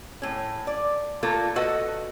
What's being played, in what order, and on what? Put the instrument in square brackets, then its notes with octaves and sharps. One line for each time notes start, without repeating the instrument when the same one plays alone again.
[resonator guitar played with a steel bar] A2 C#4
D5
A3 A#3 F4 A4 A#4
F#4 A4 B4 D#5 F#5